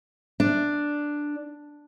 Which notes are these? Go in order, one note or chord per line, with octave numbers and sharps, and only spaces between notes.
D4